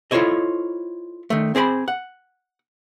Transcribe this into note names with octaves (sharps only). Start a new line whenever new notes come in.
E4 F4 A4 C5 C#5 D#5
D#3 A3
C4 G#4 C5 B5
F#5